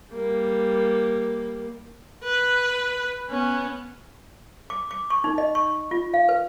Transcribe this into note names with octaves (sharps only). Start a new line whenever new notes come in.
G3 A#3
B4
B3 C#4
D6
D6
C#6
D#4
D#5
C#6
F4
F5
B4